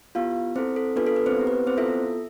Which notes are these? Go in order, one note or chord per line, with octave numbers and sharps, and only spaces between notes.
B3 E4 F4 G4 F5
C4 E4 A4 C5
A4
B3 D4 F4 A4 B4
A4
B4
C4 C5
B3 E4 G4
B4
C4 C5
B3 E4 F4 A4 E5